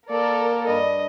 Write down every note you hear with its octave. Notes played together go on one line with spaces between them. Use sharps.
A#3 A4 A#4 D5
G2 D#5